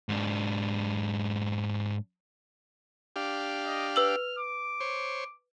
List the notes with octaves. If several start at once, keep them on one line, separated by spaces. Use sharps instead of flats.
G#2 D4
D4 G4 F5
D#5
B4 E6 F6 F#7
D6
C5 C#5